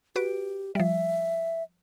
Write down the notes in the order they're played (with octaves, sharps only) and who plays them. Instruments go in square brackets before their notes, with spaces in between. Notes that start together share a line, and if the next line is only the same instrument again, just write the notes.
[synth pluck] F#4 B4 D7 [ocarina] G4
[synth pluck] F3 G3 [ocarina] E5